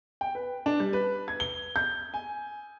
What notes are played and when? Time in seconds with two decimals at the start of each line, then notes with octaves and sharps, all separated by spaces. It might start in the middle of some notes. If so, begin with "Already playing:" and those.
0.21 G5
0.35 B4
0.66 D4
0.80 G3
0.93 B4
1.28 G#6
1.40 G7
1.76 G6
2.14 G#5